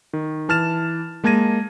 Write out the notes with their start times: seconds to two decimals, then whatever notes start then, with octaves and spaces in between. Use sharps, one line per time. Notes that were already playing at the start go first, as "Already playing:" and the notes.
0.13 D#3
0.49 E3 A5 F6 A6 E7
1.24 G#3 A#3 A5 G#6 A#6 D#7